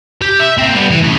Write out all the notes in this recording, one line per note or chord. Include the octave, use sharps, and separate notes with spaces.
G4
E5
A#3 C4
G3 B3
E3
C#3 A3